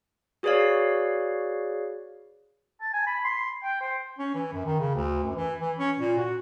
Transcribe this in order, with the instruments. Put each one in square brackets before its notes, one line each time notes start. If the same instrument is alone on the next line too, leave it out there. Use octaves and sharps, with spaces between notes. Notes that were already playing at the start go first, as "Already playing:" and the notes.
[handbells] F#4 G#4 B4 C#5 D5 F5
[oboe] A5
G#5
B5
C6
G5
C5
[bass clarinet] C#4
E3
F#2
D#3
C#3
D2
F#2
E3
E3
C#4
A#2
F#4